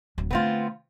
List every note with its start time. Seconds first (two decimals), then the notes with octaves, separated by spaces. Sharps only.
0.18 D1 F#3
0.31 D3 A3 B3 C4 F4